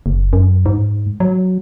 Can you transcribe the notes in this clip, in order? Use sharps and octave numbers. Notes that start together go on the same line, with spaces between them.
F#1
F#2
G#2
F#3